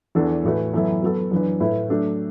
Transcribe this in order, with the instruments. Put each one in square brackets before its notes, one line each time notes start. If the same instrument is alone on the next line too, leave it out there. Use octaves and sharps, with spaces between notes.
[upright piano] E2 E3 D4 A4
A2 E3 A3 F#4 B4
F#2 E3 B3 E4 A4
F#3 B3 F#4 A4
F#2 E3 D4 B4
A2 A3 E4 B4
F#3 A3 D4 A4